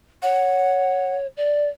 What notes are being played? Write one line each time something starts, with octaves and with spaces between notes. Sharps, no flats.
C#5 F#5
D5